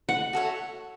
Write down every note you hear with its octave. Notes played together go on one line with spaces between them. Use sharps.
F#5
F#4 A4 C#5 E5